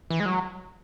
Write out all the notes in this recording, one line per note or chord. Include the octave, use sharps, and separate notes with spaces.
E3
G#3
F#3